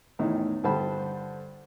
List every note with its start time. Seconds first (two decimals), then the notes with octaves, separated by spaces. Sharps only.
0.19 E2 A2 D#3 E3
0.64 G2 D3 C5 A5 B5